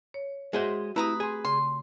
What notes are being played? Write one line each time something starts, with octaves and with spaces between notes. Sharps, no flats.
C#5
G#3 F#4 G#4 C5 E5 F#5
A3 C4 E4 G4 B4 A#5 D#6
G#4 G#5 C6
C#3 C6